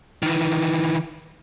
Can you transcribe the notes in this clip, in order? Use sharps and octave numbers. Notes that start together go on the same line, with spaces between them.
D#3 E3